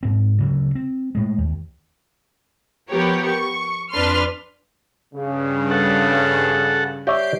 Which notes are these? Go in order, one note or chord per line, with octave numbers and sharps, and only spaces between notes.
G#2 C4
D2 C#3 F#3
C4
A2 G#3
D#2
F3 B3 G4 A#4 C#5
C#6
F2 D4 B4 C6 F6
G2 C#3
A4 F#5
G4 C#5 D5 E5 C7 D7